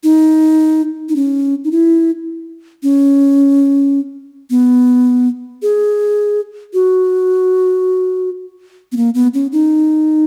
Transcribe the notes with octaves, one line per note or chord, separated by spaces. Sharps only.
D#4
D#4
C#4
D#4
E4
C#4
B3
G#4
F#4
B3
A#3
B3
C#4
D#4